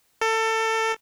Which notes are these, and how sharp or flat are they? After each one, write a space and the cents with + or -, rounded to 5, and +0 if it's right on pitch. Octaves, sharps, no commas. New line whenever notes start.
A4 +25